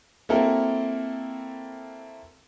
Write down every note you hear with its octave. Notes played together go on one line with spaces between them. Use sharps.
A#3 C4 E4 F#4 A4 A#4